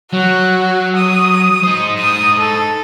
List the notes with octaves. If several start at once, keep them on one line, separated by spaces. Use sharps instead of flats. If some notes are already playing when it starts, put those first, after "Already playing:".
F#3 F#4
D#6
D#4 C5
D#6
A4